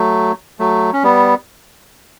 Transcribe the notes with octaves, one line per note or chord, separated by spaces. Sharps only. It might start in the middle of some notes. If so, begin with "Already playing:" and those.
Already playing: F#3 A3
F#3 A3
C#4
G3 B3